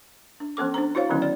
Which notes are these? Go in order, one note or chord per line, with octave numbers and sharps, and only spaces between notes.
D4
F3 B3 C#4 A4 D6
D4 C5 A#5
E4 F#4 C5 C#5 F5
D3 D#3 F#3 B3 C#4 E4
D5